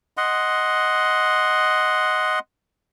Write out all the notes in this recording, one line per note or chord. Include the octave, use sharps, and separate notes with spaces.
D#5 F#5 C6